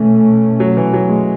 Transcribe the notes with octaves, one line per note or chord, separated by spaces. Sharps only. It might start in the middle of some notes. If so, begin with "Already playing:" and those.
Already playing: B2 E3 A3 C#4
F#3
E3
F#3
G#3